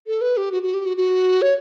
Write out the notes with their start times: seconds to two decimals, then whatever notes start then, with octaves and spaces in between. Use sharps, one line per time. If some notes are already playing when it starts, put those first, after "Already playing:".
0.07 A4
0.21 B4
0.37 G4
0.52 F#4
0.63 F#4
0.74 G4
0.85 F#4
0.97 F#4
1.42 C#5